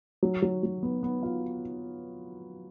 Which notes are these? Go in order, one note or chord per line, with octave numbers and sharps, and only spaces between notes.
F#3
F#3
F#3
B3
B3
F4